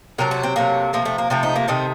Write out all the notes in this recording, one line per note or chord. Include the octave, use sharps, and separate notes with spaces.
C3 F#3 A3 A#4
F#4
C4
C3 F#3 A3 A#3
C3 F3 A3 A#3
A3
A#3
C3 F3 A3 C4
D#4
A#3
C3 D#3 A3 C4